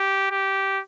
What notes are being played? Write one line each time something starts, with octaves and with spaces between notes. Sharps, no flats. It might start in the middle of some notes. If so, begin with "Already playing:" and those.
Already playing: G4
G4